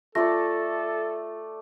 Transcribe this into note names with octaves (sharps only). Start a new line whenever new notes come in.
A3 F4 A4 D5 A#6